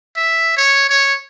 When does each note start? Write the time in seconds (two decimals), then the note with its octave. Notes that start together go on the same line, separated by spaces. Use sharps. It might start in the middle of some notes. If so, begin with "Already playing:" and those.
0.16 E5
0.57 C#5
0.90 C#5